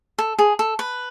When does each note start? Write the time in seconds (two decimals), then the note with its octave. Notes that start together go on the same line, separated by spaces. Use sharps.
0.18 A4
0.39 G#4
0.59 A4
0.79 B4